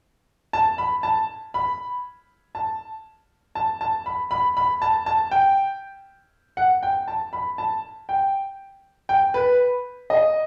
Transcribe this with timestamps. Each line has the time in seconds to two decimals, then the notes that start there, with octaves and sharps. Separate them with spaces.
0.53 A5
0.78 B5
1.03 A5
1.54 B5
2.55 A5
3.55 A5
3.81 A5
4.06 B5
4.31 B5
4.57 B5
4.82 A5
5.06 A5
5.31 G5
6.57 F#5
6.83 G5
7.08 A5
7.33 B5
7.58 A5
8.09 G5
9.09 G5
9.34 B4
10.10 D#5